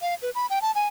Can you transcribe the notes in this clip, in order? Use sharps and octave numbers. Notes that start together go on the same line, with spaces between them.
F5
B4
B5
G5
A5
G#5